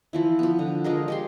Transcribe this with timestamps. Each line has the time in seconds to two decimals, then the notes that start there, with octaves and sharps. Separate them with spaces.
0.13 E3 F3 E4
0.39 F3 B3
0.59 D3
0.84 F3 G#3 G#4 A#4
1.08 G#3 G4 C6